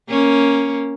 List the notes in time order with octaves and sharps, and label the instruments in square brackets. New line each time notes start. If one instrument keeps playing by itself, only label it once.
[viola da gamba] A#3 C#4